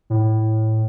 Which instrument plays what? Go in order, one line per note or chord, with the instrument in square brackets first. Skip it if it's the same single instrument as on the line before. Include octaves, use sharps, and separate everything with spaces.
[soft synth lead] A2